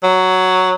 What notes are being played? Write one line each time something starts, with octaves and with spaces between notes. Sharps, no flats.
F#3